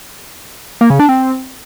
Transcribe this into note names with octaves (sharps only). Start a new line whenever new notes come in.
A#3
C#3
D4
C4